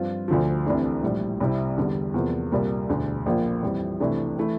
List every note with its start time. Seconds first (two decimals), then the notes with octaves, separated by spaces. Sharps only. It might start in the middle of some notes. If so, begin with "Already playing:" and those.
Already playing: G2 F3 C4 F4
0.28 D2 D3 F3
0.66 C2 C3 E3 A3 D4
1.03 A#1 A2 G3
1.41 C2 C3 G3 C4 E4
1.77 E2 D3 G3
2.14 E2 C3 F3 A#3
2.52 C2 A#2 G3 A#3
2.89 E1 D2 D3
3.26 A#1 A#2 F3 A#3 F4
3.63 F2 E3 G3
4.00 C2 C3 E3 A3 D4
4.38 E3 A3 E4